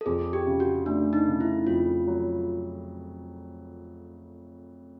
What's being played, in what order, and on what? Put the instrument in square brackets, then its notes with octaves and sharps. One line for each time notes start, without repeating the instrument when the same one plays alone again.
[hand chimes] A4
[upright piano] F2 [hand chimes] G#4
[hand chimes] G4
[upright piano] C#3
[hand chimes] F#4
[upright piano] A3 [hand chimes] D4
[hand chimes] D#4
[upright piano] C#3
[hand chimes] E4
[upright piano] F2 [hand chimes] F4
[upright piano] F#3